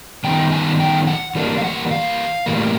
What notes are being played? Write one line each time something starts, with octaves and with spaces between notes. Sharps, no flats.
D#3 G3 B3 D#4 G5
G#5
G5
F#5
E3 G3 A#3 D4
F5
F#5
F5
A2 E3 G3 A#3